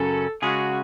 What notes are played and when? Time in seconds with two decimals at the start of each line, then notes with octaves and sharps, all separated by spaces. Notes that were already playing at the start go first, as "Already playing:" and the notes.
Already playing: F#2 C#3 F#3 C#4 A4
0.42 C#3 G#3 C#4 F#4 G#4